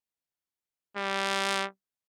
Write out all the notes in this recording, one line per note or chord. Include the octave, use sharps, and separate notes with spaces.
G3